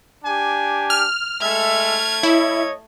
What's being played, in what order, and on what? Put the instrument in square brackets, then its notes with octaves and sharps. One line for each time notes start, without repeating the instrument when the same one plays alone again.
[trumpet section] D4 G4 G#5
[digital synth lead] F6
[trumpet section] G#3 A4 E5 [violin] A3 G#6
[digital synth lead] E4 [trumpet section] C#5 D#5 E5